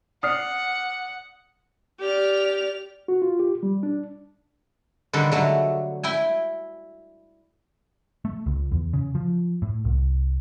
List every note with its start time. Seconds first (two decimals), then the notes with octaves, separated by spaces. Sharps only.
0.23 D5 F#5 D#6 F6 C7
1.99 G4 D5 F6
3.08 F#4
3.22 F4
3.39 G4
3.63 G3
3.83 D4
5.13 D3 D#3 G3 A4 B4
5.32 D3 F#3 A3
6.03 E4 G5 G#5
8.25 A3
8.46 C#2
8.72 E2
8.93 C#3
9.15 F3
9.62 A2
9.85 C2